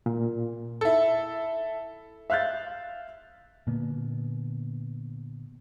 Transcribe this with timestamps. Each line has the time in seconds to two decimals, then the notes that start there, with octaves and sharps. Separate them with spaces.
0.06 A#2
0.81 E4 A4
2.30 E5 F5 F#6 G6 A6
3.67 A#2 D3 A#3 B3